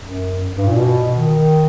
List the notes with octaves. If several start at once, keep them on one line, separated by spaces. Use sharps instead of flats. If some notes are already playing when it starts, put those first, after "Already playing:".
F#2
G2
A#2
B2
D#3